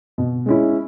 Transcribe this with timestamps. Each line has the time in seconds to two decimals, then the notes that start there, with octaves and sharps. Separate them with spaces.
0.18 B2
0.46 G#3 C#4 E4